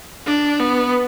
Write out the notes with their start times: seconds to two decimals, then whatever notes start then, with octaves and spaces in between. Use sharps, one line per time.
0.26 D4
0.60 B3